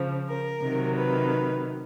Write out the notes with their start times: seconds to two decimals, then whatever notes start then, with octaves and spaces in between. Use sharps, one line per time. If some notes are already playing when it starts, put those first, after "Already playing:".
Already playing: C#3 F3
0.29 A#4
0.62 C3 D#3 F#3
0.95 B4